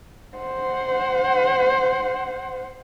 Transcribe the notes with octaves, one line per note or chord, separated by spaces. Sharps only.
C5 F#5